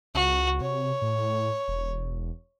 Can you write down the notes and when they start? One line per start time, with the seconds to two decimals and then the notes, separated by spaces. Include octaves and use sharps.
0.14 C#2 F#4
0.61 C3 C#5
1.02 A2
1.68 E1